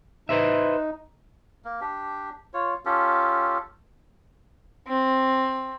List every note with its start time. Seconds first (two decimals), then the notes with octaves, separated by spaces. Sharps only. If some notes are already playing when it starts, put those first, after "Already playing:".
0.29 D#4 B4 C5 E5
1.65 A#3
1.81 D4 G4
2.54 F4 C#5
2.85 C#4 F4 G4 A4
4.88 C4